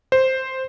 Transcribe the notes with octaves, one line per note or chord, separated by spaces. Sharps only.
C5